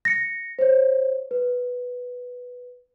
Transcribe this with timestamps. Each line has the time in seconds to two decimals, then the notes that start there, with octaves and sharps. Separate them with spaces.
0.05 A#6 C#7
0.59 C5 C#5
1.31 B4